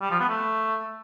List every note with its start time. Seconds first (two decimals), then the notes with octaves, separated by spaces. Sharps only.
0.01 G3
0.10 F3
0.20 B3
0.29 A3